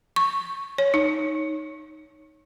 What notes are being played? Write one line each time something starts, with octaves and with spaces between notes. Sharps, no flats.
C#6
C#5
D#4